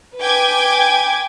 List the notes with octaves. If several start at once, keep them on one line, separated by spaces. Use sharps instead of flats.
B4 G5 G#5 D6 G#6